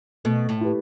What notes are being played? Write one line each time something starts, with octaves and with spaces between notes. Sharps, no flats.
B2 A3
A2
E4 G4 B4